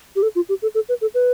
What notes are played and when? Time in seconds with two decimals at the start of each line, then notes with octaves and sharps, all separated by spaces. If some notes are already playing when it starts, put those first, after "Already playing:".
0.16 G4
0.22 A4
0.36 F4
0.49 G4
0.62 A4
0.75 A4
0.89 B4
1.01 A4
1.14 B4